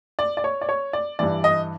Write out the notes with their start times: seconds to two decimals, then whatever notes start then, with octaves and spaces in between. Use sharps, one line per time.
0.19 D5
0.37 D5
0.44 C#5
0.61 D5
0.69 C#5
0.93 D5
1.19 G2 E3 D5
1.44 D#5